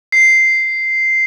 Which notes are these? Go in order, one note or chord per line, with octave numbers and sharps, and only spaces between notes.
C7